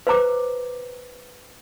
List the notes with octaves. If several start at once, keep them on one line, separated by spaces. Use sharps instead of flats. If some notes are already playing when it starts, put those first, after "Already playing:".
B4 C5 A#5 D6